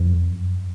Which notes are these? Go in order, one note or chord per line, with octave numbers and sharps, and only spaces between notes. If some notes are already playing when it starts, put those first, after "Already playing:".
Already playing: F2
F#2